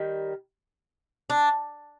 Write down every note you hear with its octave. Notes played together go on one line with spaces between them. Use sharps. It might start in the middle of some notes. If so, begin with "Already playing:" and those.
Already playing: D#3 G3
D4